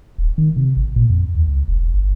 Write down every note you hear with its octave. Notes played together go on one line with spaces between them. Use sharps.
D#1
D#3
C3
G#1
A#2
F2
D#2
C#2
E1
G1